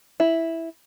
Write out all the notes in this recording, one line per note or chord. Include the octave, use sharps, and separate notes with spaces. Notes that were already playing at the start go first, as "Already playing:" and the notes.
E4